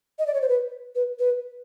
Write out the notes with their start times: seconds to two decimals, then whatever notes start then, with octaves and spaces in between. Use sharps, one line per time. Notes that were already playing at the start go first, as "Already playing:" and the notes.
0.18 D#5
0.26 D5
0.33 C#5
0.41 C5
0.48 B4
0.95 B4
1.19 B4